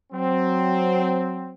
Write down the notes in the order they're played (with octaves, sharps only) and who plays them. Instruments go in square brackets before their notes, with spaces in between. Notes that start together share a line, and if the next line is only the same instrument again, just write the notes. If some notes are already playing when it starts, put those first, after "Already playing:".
[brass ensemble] F#3 C4